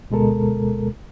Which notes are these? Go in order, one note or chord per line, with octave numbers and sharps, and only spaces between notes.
D2 B2 G#3 A4 A#4